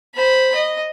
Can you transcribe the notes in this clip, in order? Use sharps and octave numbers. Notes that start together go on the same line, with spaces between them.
C5 B5
D#5